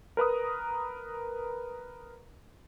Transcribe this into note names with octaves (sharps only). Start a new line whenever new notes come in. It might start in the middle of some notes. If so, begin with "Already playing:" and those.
A#4 B4 A#5 D#6